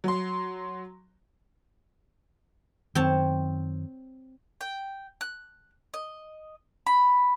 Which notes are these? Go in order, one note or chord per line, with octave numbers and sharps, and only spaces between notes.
F#3 C6
F#2 D#3 C4 C#5 A5
G5
F#6
D#5
B5